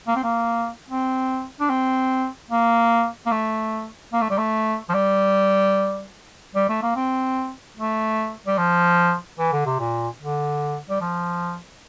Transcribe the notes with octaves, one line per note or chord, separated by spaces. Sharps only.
A#3
C4
A#3
C4
D4
C4
A#3
A#3
A3
A#3
A3
G3
A3
F3
G3
G3
A3
A#3
C4
A3
G3
F3
E3
D3
C3
A#2
D3
G3
F3